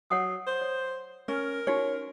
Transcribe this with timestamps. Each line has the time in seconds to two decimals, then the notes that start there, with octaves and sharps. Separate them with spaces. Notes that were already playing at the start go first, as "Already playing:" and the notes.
0.10 F#3 C#5 F#5 D#6
0.47 C5
0.61 C#5
1.28 C#4 A#4
1.67 C#4 D#4 F#4 C#5